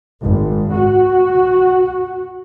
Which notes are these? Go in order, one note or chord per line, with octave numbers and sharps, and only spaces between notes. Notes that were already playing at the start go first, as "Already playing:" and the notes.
G#1
F#4